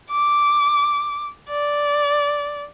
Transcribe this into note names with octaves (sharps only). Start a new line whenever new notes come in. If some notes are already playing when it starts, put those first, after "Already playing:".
D6
D5